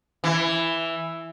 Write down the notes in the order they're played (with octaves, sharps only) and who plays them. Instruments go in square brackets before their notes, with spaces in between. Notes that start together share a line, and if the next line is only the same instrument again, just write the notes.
[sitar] E3